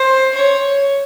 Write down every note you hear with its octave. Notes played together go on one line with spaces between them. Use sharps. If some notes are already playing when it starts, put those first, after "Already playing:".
Already playing: C5
C#5